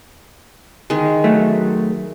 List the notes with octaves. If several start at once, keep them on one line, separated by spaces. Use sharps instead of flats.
D#3 G#3
F#3 A3